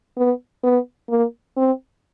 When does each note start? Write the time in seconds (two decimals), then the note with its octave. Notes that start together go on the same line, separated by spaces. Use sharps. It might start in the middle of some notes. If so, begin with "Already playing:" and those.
0.17 B3
0.64 B3
1.09 A#3
1.57 C4